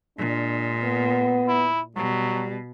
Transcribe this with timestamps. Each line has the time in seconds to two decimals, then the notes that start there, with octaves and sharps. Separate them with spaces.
0.18 A#2 G#3 D4
0.82 B3
1.48 E4
1.96 B2 F#3 G3